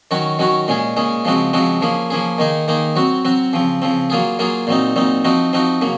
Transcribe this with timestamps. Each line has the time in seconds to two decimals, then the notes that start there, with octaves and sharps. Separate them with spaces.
0.11 D#3 F#3 C#4 F#4
0.39 D#3 F#3 C#4 F#4
0.68 A#2 G#3 C#4 G#4
0.96 A#2 G#3 C#4 G#4
1.25 C#3 F3 G#3 C4 F#4
1.53 C#3 F3 G#3 C4 F#4
1.81 F3 A#3 C#4 G#4
2.10 F3 A#3 C#4 G#4
2.38 D#3 A#3 D#4 G#4
2.68 D#3 A#3 D#4 G#4
2.96 F#3 C4 F#4
3.25 F#3 C4 F#4
3.53 C#3 F3 C4
3.82 C#3 F3 C4
4.10 F#3 A#3 F4 G#4
4.39 F#3 A#3 F4 G#4
4.67 A#2 F#3 C4 D#4
4.96 A#2 F#3 C4 D#4
5.24 F3 C4 D#4 F#4
5.53 F3 C4 D#4 F#4
5.81 C#3 F#3 A#3